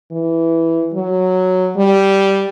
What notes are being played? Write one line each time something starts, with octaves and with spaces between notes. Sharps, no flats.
E3
F#3
G3